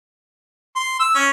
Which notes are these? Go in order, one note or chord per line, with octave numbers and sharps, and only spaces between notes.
C6
E6
C#4